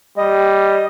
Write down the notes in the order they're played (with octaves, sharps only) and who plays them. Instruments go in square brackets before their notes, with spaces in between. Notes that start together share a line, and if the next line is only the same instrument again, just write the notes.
[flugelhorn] G3 [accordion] D#5